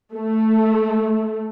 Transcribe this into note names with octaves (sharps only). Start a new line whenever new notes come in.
A3